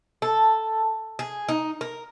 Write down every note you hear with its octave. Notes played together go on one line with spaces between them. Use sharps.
A4
G#4
D#4
A#4